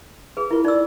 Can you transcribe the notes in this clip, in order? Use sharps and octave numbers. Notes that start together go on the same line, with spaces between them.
G#4 B4
E4 F4 A#4
D#4 D5 E6